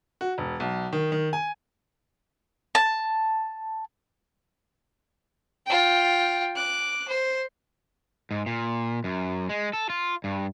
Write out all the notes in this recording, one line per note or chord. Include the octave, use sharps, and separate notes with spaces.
F#4
E1
B1
D#3
D#3
G#5
A5
F4 G5
D6 F#6
C5
G#2
A#2
F#2
G#3
A4
F4
G2